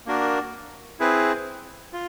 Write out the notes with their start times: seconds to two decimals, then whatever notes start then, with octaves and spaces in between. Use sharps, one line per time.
0.06 A#3 D4 F#4 A#4
1.00 C4 E4 G#4 B4
1.93 F4